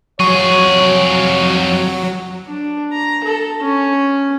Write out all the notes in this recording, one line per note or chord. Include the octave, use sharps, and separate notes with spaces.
F2 F#3 G#4 C#5 C#6
D4
A#5
A4
C#4